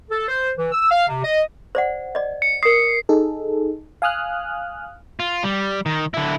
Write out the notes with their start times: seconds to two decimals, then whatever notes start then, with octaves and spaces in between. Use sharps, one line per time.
0.11 A4
0.28 C5
0.57 E3
0.72 E6
0.91 F5
1.08 C3
1.24 D#5
1.75 C5 D5 F#5
2.15 D5 D#5
2.42 C#7
2.63 A#4 D#6 C7
3.09 D#4 G#4 A4
4.02 F5 G#5 D#6 F6 F#6
5.20 F4
5.44 G3
5.86 D#3
6.14 D3 E4